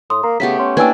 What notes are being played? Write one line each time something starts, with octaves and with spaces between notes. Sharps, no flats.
A2 C6 D#6
A#3 A#5
C#3 A3 B3 G4 B6
C#4 C6
A#3 D4 E4 B4 G5 G#5 E6 G#6